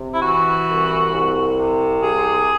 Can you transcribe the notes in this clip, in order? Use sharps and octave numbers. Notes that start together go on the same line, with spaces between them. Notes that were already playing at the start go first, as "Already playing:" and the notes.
Already playing: C3
E4
E3 F#4
C2
C2
C3
C2 G#4